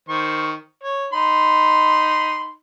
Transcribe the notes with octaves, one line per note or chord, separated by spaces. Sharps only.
D#3 C5 C#6
C#5
D#4 B5 C6